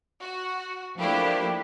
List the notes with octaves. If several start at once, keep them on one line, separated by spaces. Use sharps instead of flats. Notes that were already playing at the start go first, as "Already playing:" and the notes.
F#4
F3 A3 A#3 D4 E4 G4